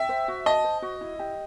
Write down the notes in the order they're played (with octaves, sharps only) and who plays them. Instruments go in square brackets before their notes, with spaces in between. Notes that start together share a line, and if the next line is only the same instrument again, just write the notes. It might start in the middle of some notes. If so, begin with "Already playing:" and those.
Already playing: [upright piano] E5 [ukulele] G5
[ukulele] C5
F#4
[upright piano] D#5 [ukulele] A5
[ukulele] C5
F#4
E4
G4